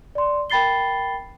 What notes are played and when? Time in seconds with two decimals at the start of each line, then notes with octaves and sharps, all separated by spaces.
0.15 D5 C6
0.50 A#4 G5 B5 A6 C7 G7